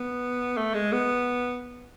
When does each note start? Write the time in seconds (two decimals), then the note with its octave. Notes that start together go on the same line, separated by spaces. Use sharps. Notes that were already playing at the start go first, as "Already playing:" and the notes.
Already playing: B3
0.57 A3
0.74 G#3
0.93 B3